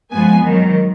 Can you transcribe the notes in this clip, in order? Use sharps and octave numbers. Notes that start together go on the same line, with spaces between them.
G#2 F3 G#3 B3 G#5
G#2 D#3 F#3